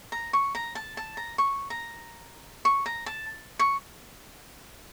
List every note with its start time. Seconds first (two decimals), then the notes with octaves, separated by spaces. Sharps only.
0.12 A#5
0.33 C#6
0.55 A#5
0.75 A5
0.97 A5
1.17 A#5
1.38 C#6
1.70 A#5
2.65 C#6
2.86 A#5
3.06 A5
3.59 C#6